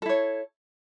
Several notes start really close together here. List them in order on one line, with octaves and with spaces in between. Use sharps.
A4 E4 C#5